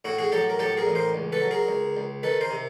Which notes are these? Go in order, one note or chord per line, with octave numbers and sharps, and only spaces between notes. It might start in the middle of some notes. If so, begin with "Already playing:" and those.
A2 E4 F#4
F#4 G#4
F#3 G4 A4
A#4
A2 G4 A4
G#4 A#4
A1
A#4 C5
C#2
A4 B4
F#3
G#4 A#4
C#2
C#2
D#3 A4 B4
A#4 C5
C3